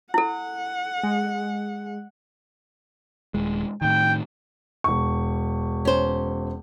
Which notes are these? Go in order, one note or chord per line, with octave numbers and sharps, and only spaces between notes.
E4 A4 F#5
G#3
D#1 G#3
A2 D#3 G5
E1 C#6
C#4 C5